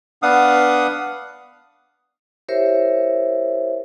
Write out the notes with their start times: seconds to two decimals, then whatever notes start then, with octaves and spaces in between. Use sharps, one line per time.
0.23 B3 D4 F5 F#5 D#6
2.48 E4 G4 A#4 C5 C#5 E5